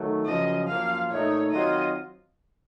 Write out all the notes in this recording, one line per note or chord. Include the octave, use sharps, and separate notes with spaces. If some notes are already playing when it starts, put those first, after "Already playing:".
Already playing: D#3 F#3 A3
F#2 C#3 F3 D#5
F#2 F3 A#3 F4 F5
A#2 A3 D#4 C#5
D#3 F#3 C4 F4 D#5